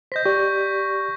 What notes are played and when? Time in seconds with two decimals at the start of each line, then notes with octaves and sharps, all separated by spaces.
0.12 C5 D#5 G6 A#6 B6
0.26 G4 D5 C#6